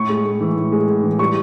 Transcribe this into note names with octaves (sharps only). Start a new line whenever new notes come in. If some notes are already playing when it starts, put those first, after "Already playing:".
Already playing: A2 C#6
G#3
A2
E3
A2
G#3
A2
E3
G3 C#6